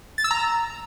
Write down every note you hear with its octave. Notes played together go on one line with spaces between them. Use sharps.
A6
E6
A#5